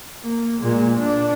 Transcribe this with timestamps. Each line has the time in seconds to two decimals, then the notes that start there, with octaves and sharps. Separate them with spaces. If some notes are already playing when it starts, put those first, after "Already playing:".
0.23 A#3
0.60 A#2 G#3
0.97 D4